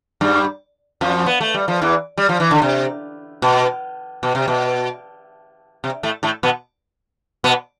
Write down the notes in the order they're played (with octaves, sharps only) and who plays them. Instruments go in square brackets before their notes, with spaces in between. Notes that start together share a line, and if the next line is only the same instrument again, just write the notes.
[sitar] G2 G3
F2 F3
B3
A3
G3
F3
E2 E3
G3
F3
E3
D3
C3
B2
B2
C3
B2
C3
A2 A3
A2 A3
B2 B3
B2 B3